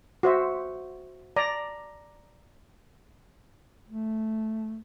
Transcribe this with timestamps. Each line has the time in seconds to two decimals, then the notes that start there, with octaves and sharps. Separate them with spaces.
0.23 F#4 C5 E5
1.36 D5 A#5
3.88 A3